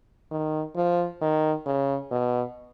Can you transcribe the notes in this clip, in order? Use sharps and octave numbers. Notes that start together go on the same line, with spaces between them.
D#3
F3
D#3
C#3
B2